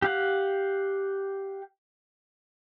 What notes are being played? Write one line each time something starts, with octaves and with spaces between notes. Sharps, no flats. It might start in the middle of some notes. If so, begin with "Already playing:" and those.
G4 F5 F#5